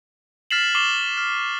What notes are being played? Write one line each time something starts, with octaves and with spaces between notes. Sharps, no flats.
F6 A6 B6 C7 E7 F#7
C#6 D6 C7 E7 G7
F6